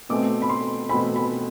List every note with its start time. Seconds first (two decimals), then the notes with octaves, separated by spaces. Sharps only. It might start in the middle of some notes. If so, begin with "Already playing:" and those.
0.09 B2 A3 C4 D6
0.42 B5
0.49 C6
0.89 B2 A3 C4 B5
1.16 B5